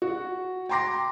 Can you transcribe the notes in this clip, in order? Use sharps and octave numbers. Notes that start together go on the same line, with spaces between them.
F#4
G5 A#5 C6 D6 A#6